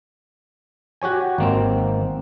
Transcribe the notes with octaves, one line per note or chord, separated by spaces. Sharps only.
F#4 G4 C#5 G#5
G#1 A#3 C4